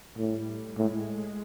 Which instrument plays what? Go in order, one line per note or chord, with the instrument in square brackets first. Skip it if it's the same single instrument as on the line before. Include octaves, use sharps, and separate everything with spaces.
[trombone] A2 [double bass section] G3
[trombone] A2 [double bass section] G#3